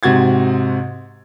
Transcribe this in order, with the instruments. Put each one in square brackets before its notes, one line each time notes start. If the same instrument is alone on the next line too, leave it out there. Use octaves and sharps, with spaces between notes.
[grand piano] G#2 C3 F#4 G#6 A6